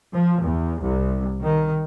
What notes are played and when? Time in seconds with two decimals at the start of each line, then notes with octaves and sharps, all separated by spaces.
0.14 F3
0.43 E2
0.81 C2
1.44 D#3